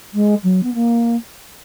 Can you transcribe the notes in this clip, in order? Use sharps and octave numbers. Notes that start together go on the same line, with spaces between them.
G#3
F#3
B3
A#3